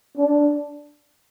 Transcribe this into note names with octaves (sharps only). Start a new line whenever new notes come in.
D4